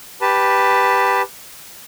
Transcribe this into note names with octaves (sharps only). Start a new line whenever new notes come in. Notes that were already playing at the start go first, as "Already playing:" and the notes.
G4 B4 A5